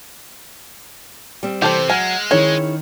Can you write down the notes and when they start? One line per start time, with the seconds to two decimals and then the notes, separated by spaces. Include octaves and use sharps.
1.43 G3 C4
1.62 C3 E3 G4 A4 C5
1.90 F#3 G#3 G#5 F6 C7
2.31 D#3 C#4 D#4 E4 G#4 C#5